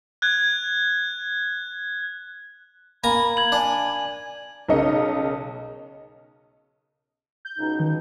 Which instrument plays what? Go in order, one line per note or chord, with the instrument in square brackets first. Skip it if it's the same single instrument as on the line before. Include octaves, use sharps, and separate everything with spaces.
[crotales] F#6 G#6
[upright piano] A#3 [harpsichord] G#5 A#5 [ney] B5
[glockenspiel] G#6 F#7
[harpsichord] D4 [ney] G#5
[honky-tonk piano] B1 C#3 A#4 D#5 C#7
[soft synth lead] G6
[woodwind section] C#2 B2 D#4
[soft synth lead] D#3